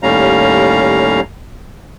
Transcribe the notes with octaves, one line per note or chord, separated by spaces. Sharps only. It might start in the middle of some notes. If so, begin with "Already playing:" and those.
D#2 A2 G3 C#4 F5 A#5